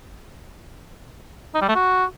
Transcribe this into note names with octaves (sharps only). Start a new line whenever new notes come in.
D#4
G3
A3
F#4